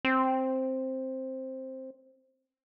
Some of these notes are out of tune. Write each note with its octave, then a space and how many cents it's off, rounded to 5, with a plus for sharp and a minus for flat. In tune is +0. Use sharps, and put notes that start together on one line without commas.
C4 +5